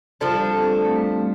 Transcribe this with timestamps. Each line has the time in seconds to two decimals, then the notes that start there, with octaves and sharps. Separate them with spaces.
0.21 F3 G3 D4 G4 A4
0.45 C4
0.59 C4
0.71 A3
0.85 A3
0.95 G3